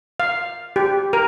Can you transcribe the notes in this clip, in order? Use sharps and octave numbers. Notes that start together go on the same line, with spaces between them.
F5
G4
A#4